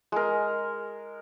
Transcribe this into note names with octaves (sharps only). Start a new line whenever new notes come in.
G#3 A#4